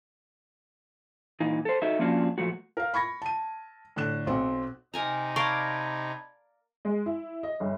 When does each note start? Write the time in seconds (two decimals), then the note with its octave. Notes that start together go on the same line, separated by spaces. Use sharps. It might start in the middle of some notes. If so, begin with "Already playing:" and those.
1.40 A#2 E3 D#4
1.65 A4 C5
1.82 D#4 F#4 A4 D#5 E5
1.99 F3 A#3 C#4 D4 F4 F#4
2.38 A#2 F3 A3 F#4
2.77 A#4 F5
2.94 B5 C#6 G#6 A#6
3.22 A5 D#7
3.96 A2 D3 F#6 E7
4.27 B1 C4 F#5
4.94 C3 D#4 A#4 G#5 A#5
5.36 A#4 D5 F5 A5 B5 C#6 G#6
6.85 G#3
7.06 E4
7.43 D#5
7.60 G1